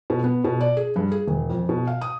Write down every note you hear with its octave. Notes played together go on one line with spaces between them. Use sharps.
B2
B3
B2
D5
G#4
G2
G#4
E1
F2
B2
F5
D#6